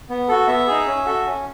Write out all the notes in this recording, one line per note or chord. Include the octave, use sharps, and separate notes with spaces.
B3
F#4 A4
B3 E5
D#4 G#4
C#4
F#4 A4
C#4